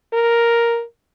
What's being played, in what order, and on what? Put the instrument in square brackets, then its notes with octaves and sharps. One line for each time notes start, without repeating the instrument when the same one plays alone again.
[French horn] A#4